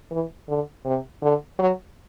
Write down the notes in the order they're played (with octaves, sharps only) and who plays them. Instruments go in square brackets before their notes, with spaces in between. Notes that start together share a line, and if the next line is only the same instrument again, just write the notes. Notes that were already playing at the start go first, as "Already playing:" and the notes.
[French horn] E3
D3
C3
D3
F#3